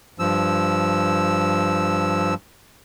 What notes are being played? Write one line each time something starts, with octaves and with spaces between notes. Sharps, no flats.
G2 F3 E6